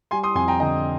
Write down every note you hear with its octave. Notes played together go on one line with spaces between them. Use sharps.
G3 G#5 C6
C6 D#6
F2 G#5 C6
G5 A#5
D3 D#5 G5